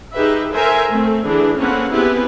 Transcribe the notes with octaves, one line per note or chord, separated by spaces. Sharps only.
D#4 G4 G#4 B4 E5
A4 A#4 C5 E5 G#5
A3 C4
D3 E3 D4 G#4
A#3 C4 C#4 A4 B4 F#5
B3 C4 E4 G4 G#4 B4